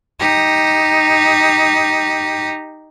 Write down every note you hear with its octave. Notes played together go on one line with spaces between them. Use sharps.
D#4 G4